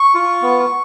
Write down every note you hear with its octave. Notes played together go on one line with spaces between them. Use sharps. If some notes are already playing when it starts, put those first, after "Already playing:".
Already playing: C#6
F4
B3